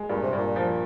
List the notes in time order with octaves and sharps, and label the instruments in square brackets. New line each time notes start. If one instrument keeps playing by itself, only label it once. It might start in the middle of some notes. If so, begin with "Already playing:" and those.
Already playing: [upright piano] G#3
[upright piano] G2 [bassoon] A#2
[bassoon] C3
[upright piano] G2 [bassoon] A#2
[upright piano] F3